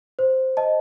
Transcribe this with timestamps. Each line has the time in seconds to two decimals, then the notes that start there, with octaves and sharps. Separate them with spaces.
0.19 C5
0.57 D#5 A5